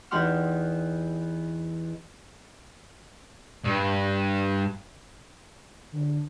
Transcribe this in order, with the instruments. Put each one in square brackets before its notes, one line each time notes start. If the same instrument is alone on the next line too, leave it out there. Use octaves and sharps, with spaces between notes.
[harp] E2 D#4 G4 F#5 C6 F6
[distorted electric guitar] G2
[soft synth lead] D3